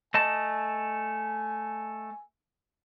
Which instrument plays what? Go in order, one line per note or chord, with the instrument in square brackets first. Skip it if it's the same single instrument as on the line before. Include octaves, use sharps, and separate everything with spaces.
[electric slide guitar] A3 D#5 A5 [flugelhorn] G#5